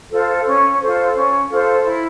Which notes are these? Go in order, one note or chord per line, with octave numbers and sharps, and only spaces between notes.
F4 A4 C5
C#4
F4 A4 C5
C#4
F4 A4 C5
E4